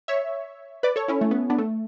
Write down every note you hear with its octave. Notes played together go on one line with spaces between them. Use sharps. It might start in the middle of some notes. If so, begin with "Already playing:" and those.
C#5 E5
B4 D5
A4 C#5
C#4 E4
A3
B3
B3 D4
A3